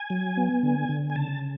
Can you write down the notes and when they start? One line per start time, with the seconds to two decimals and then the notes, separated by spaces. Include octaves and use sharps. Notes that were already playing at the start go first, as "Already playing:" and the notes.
Already playing: G#5
0.10 F#3
0.37 B3
0.63 D3
0.89 D3
1.10 G#5
1.16 C#3 A5